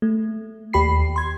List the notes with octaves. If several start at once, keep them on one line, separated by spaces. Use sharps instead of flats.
A3
D#2 G4 B5 C7
C6 G#6